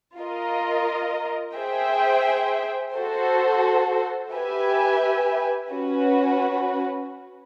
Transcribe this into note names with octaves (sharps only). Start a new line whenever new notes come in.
F4 A#4 D#5
G#4 C5 E5 G5
F#4 A4 C5
G4 B4 E5 G#5
C#4 F#4 B4